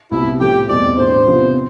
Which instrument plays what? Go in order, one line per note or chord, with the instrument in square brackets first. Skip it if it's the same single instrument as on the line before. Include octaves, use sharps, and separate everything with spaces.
[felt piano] C2 C3 G3 B3 [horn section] E4
[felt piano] A2 F3 A3 [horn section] G4
[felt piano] E2 B2 G3 C4 [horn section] D5
[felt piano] A2 G3 D4 [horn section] C5
[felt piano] C3 F3 B3 F4
C4